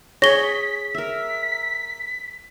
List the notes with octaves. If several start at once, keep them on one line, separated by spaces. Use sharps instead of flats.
G#4 C#5 A#6 B6 G7
A#4 E5 B6